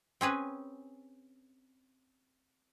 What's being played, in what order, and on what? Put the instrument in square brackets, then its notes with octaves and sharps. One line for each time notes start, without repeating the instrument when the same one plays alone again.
[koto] C4 C#4 G#4 B4